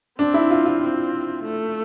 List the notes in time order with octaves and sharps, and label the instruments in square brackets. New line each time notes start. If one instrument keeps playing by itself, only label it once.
[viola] C4 [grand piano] D4
[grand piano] E4
F4
F4
[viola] C4
A3